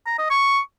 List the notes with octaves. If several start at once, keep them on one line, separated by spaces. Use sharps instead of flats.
A#5
D#5
C#6